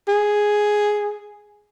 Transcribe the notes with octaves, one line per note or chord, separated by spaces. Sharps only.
G#4